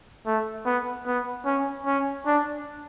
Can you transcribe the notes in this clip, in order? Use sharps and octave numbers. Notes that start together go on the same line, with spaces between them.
A3
B3
B3
C#4
C#4
D4